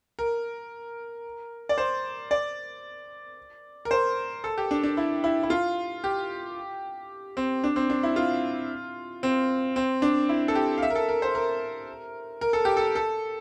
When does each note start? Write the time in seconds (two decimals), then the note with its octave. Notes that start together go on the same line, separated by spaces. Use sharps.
0.19 A#4
1.69 D5
1.78 C5
2.31 D5
3.85 A#4
3.91 C5
4.44 A4
4.58 G4
4.71 D4
4.83 D4
4.97 E4
5.24 E4
5.43 E4
5.50 F4
6.04 G4
7.37 C4
7.64 D4
7.76 C4
7.90 D4
8.03 E4
8.16 F4
9.23 C4
9.76 C4
10.02 D4
10.29 E4
10.48 A4
10.55 G4
10.78 F5
10.82 E5
10.90 A#4
10.95 A4
11.09 A#4
11.22 C5
11.35 A#4
12.41 A#4
12.53 A4
12.65 G4
12.77 A4
12.95 A4